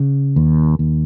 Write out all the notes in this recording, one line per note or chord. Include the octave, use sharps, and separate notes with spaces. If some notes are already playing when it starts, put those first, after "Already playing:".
Already playing: C#3
D#2
D#2